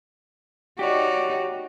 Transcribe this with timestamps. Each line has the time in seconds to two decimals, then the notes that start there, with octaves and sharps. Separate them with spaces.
0.79 D#4 F#4 G4 C#5 D5